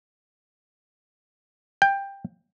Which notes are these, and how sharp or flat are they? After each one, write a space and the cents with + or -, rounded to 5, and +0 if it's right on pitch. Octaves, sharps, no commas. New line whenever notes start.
G5 +15